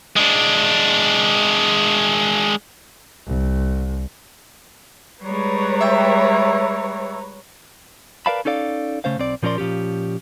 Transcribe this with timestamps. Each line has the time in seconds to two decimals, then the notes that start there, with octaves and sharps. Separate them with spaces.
0.16 G#3 D4
3.27 C2
5.23 G3 G#3 B4 C#5 A#5
5.81 E5 G5
8.26 A#4 B4 D5 F5 A5 B5
8.45 C#4 D#4 A4 D5 F5
9.04 C#3 A3 C#4 C5 F5
9.18 B1 C4 D5
9.43 A#2 F3 C#4 A#4 D5 C6
9.58 A#2 F3 C#4 G4